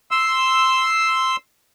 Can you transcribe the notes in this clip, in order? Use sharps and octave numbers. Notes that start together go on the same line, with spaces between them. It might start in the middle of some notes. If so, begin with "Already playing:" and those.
C6 E6